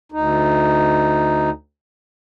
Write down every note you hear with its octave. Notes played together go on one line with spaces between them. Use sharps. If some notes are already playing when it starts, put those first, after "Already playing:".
D2 D#4